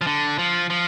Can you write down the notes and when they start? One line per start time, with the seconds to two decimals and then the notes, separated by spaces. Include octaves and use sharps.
0.01 F3
0.07 D3
0.38 F3
0.70 F3